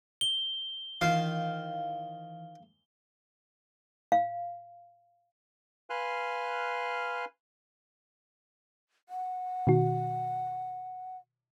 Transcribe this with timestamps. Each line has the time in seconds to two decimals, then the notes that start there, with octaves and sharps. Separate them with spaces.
0.21 G7
1.01 D#3 E3 F4 C5 F5
4.12 F5
5.90 B4 F5 G#5 C6 F6 F#6
9.09 F#5
9.67 B2 D#3 F#4